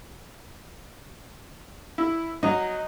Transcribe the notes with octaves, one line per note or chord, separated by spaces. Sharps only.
E4
F#3 D#4 D#5